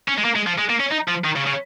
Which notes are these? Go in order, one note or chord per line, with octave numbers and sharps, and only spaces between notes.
C#4
G#3
A#3
G#3
F3
G#3
A#3
C#4
D#4
F3
D#3
C#3
C#3